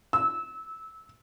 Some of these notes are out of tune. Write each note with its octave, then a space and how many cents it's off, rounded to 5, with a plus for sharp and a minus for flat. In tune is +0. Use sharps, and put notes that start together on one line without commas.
E6 -25